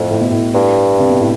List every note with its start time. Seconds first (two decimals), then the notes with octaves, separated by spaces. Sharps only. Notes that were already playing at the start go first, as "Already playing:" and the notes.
Already playing: F2 A2 A3
0.11 A2
0.21 B2
0.31 A2
0.54 G2
0.99 C3
1.10 B2
1.20 A2